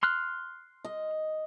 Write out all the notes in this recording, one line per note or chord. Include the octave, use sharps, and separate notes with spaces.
C6 F6 F#6
D#5